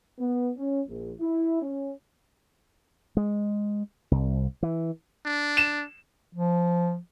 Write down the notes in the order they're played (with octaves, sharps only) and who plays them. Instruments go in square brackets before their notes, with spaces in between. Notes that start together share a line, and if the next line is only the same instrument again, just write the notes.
[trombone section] B3
C#4
A#1
E4
C#4
[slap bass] G#3
C2
E3
[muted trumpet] D4
[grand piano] E7
[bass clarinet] F3